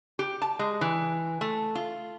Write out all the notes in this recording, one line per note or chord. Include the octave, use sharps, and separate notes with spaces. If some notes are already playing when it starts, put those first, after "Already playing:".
G4
A5
G#3
E3
A3
F4